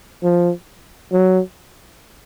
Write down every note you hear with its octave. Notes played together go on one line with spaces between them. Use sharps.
F3
F#3